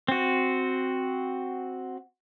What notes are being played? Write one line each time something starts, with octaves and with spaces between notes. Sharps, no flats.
C4 F#4